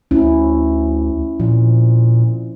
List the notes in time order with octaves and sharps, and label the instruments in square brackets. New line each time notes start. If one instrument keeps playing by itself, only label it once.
[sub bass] D2 [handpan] C#4 E4
[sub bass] A#2 [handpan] F3